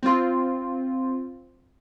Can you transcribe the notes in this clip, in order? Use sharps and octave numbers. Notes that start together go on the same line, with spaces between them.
C4 F4